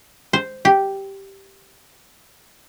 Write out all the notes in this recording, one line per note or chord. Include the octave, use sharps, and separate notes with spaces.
C5
G4